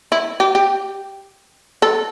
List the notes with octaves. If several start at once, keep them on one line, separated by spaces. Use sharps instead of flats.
E4
G4
G4
A4